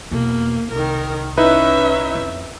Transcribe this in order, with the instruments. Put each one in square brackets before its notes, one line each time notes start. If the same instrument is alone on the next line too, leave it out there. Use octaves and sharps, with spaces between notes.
[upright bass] E2 B2 [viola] A#3
[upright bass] C2 [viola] D#3 A#4
[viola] C#4 E5 [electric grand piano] D#4 E4 B4
[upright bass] F2